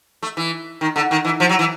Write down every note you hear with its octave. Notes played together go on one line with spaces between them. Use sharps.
A3
E3
D#3
D3
D#3
E3
F3
F#3
E3